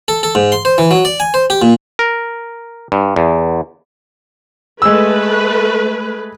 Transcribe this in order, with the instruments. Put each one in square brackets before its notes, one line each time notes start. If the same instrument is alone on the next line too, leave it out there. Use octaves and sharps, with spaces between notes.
[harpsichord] A4
A4
G#2
C6
C5
E3
F#3
D5
G#5
C5
G4
A#2
[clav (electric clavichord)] A#4
G2
E2
[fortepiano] G#3 E6 [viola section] A3 B4